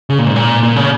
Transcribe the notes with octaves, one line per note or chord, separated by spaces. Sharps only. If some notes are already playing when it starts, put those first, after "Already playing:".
C#3
A#2
G#2
A#2
A#2
C#3